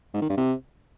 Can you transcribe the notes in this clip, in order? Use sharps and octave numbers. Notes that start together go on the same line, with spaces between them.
G#2
D#3
G2
C3